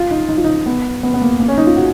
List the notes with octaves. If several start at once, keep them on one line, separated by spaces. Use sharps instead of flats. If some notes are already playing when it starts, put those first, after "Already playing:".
Already playing: F4
D#4
D#4
F4
D#4
B3
B3
B3
A#3
A#3
C#4
D#4
F4
F#4